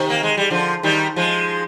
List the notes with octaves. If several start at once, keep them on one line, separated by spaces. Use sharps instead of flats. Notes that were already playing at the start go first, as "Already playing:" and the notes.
Already playing: C3 D#3
A#3
G#3
G3
D3 F3
D#3 G3
F3 G#3